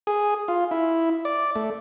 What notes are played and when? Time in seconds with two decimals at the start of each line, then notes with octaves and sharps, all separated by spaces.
0.07 G#4
0.48 F4
0.71 E4
1.25 D5
1.56 A3